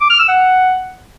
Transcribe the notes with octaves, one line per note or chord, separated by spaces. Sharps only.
D6
F6
E6
F#5